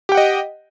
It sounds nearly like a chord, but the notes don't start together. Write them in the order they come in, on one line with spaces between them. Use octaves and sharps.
G4 G5 F#5 D#5